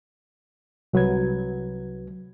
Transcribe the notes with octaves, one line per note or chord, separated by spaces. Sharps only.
C2 F#3 B4 G#6